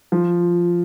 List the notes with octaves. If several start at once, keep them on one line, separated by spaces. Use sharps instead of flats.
F3